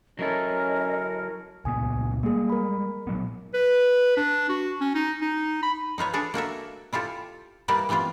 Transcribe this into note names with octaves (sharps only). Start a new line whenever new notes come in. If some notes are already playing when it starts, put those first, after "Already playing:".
F#3 C#4 E4 A4 A#4 D#5
C#2 A#2 B3 G#5 D#6
G3 G#3 A#3 G#4
A#4 B5
A#2 F#3 B3
B4
D4
F#4
C#4
D#4
D#4
B5
D#4 F4 B4 C#5
D4 G#4 A4 B4
A#3 F#4 A4 E5
E4 F4 G4 A4
G3 A#3 D#4 E4 B4 D5
E3 G3 B3 C4 F4